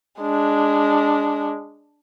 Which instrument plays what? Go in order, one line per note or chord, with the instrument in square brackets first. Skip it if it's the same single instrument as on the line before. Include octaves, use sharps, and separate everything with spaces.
[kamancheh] G#3 D4